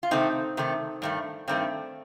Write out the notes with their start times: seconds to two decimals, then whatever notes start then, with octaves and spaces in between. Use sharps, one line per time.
0.03 F4
0.11 C3 D#3 A3 C4 D#4
0.57 C3 D#3 A3
1.02 G2 D#3 A3
1.48 G2 D#3 A3 C4